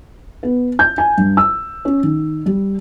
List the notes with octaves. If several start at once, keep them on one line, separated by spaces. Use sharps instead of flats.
B3
G6
G#5
G2
E6
C#4
D#3
G3